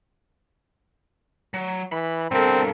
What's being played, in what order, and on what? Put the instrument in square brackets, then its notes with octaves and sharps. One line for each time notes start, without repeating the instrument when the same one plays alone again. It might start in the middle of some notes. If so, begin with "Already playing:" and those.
[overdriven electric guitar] F#3
[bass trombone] E3 [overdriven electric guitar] B5
[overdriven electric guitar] G2 B2 [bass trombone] C4 [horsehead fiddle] A4 A#4